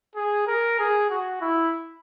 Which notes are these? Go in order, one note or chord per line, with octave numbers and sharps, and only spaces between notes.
G#4
A#4
G#4
F#4
E4